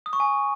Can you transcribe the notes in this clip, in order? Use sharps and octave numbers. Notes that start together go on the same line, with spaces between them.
D#6
C#6
G#5